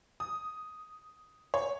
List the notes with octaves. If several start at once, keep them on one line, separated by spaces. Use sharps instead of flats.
D#6
C#5